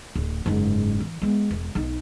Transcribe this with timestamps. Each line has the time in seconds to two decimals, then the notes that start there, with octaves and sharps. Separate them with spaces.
0.16 D1
0.46 F#1 G#2
1.00 E3
1.22 G#3 B3
1.51 E1
1.75 B1 D#4